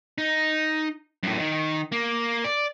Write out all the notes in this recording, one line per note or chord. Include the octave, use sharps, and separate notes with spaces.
D#4
F#2 A2
D#3
A#3
D5